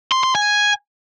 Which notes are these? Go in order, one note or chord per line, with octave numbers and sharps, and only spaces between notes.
C6
C6
G#5